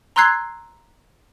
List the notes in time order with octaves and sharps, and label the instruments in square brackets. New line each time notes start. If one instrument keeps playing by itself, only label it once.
[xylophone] A#5 C6 E6 F#6 G#6 C7